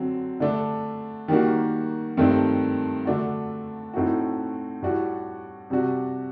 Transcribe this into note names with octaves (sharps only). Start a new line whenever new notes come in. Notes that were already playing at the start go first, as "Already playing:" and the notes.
Already playing: D3 F#3 C4
D3 A3 D4
D#3 G3 A#3 F#4
G2 D#3 A3 C4
D3 A3 D4 F#4
A2 A3 C4 D#4 F#4
A2 G3 D4 F#4
C3 G3 D4 F#4